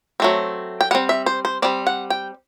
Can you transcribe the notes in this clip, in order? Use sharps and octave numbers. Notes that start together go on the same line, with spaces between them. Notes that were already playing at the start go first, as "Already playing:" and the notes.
F#3 A3 C4
G5
G3 C4 F#5
E5
C5
C5
G3 C4 D5
F#5
G5